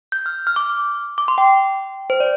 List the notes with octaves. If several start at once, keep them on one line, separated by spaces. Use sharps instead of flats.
G6
F6
F6
D6
D6
C6
G5
C5
D5